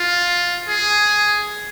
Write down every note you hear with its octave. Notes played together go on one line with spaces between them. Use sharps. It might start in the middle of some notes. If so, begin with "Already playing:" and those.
Already playing: F4
G#4